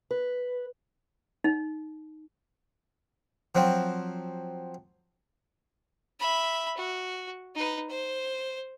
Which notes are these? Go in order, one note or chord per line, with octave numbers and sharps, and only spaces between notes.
B4
D#4
F3 F#3 C4
E5 B5
F#4
D#4 B4
C5